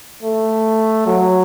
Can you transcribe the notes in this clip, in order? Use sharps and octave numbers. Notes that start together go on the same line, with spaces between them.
A3
F#3